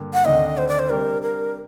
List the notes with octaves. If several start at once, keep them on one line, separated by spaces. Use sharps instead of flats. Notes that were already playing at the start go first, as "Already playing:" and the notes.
Already playing: G2 D3 G3 A#3
F#5
D2 C3 D#3 A3 D4 D#5
C5
D5
C5
C3 G3 D4 G4 A#4
A#4